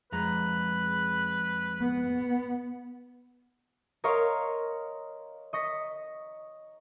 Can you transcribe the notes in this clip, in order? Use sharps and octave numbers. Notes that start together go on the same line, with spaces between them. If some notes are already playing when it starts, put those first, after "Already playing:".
F2 G#3 B4 A#5
B3
A#4 C#5 D#5 F5 C6 C#6
D#5 C#6 A#6 B6